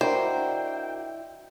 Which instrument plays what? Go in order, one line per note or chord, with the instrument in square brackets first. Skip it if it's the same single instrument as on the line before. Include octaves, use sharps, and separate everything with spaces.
[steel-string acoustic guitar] D4 F#4 A#4 [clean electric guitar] E4 D5 D#5 [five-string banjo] C5 [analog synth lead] G5